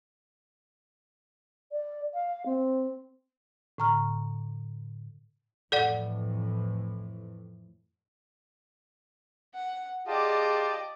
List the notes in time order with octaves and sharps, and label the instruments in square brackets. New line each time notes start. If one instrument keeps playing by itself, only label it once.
[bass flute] D5
F5
C4
[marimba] A2 D3 A#5 C#6 F6
[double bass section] F2 A2 E3 [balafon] A4 D5 F#5
[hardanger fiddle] F#5
[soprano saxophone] F4 [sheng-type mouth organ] G4 A5 [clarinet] G#4 [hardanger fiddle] D5 D#5